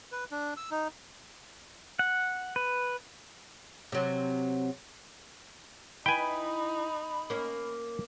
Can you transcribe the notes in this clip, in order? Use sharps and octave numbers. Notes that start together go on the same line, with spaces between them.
B4
D4
E6
D#4
F#5
B4
C3 F#3
D#4 E4 B4 G5 G#5 B5
A#3 C#4